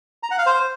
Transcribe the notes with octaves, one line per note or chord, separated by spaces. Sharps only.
A#5
F#5
F5
C5